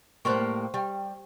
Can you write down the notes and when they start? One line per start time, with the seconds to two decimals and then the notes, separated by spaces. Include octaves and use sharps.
0.25 A2 G3 A#3 C5 C6 C#6
0.74 G3 G4 G5